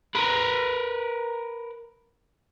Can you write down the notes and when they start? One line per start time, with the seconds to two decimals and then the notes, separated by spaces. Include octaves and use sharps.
0.15 A#4 B4